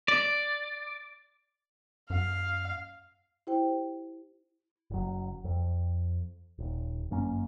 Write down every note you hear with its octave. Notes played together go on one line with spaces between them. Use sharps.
D5
F#2 F5
E4 G4 C5 G5
F#1 F#3
F2
D#1
G1 F#2 A#3 C#4